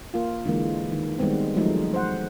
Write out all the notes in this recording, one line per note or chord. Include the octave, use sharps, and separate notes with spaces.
A#3 F4
D3 E3 G#3 A#3
D#3
D#3 G3 G#3 B3 C4
F3 F#3 G#3 A3 D#4
C5 F#5